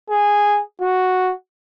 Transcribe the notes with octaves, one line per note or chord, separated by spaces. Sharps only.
G#4
F#4